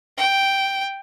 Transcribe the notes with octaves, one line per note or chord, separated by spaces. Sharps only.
G5